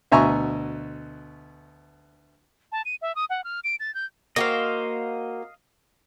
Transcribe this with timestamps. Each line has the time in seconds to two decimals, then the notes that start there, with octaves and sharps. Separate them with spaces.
0.12 D2 B2 E5 G#5 A#5 C#6
2.72 A5
2.85 D#7
3.02 E5
3.15 D#6
3.30 F#5
3.44 F6
3.64 D7
3.80 A6
3.94 G6
4.36 A#3 F#4 C5 D#5 F5